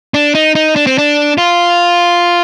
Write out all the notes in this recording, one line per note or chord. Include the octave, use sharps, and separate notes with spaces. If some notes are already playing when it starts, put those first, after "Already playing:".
D4
D#4
D#4
D4
C4
D4
F4